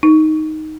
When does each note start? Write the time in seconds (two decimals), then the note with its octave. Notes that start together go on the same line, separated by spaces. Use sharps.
0.03 D#4